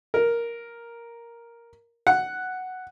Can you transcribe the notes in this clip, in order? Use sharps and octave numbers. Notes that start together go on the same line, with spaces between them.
A#4
F#5